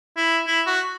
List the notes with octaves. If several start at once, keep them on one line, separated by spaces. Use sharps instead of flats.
E4
E4
F#4